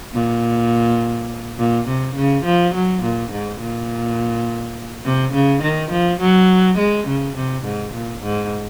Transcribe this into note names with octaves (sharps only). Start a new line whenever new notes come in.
A#2
A#2
C3
C#3
F3
F#3
A#2
G#2
A#2
C3
C#3
D#3
F3
F#3
G#3
C#3
C3
G#2
A#2
G#2